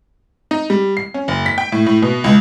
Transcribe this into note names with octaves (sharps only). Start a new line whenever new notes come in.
D#4
G3
C7
C#4
F#1
B6
G5
A2
A2
B2
C#2